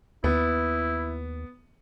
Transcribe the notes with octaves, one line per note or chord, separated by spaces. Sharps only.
D#2 B3 E4